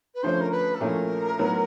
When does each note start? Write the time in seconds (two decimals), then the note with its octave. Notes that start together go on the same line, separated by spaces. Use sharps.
0.14 B4
0.22 D3 F3 A3 C#4 C5
0.40 A#4
0.51 B4
0.74 A4
0.80 A#2 F3 A3 C#4 E4 A#4
1.39 A2 F#3 B3